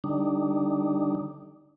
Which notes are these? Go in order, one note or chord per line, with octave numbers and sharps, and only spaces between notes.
D3 G3 D4 D#4